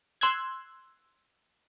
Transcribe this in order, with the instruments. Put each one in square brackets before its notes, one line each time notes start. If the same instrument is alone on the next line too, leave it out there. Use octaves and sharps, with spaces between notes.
[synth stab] C6 E6 F#6 G#6